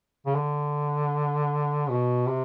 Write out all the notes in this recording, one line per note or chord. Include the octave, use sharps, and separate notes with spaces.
C#3
D3
B2
C3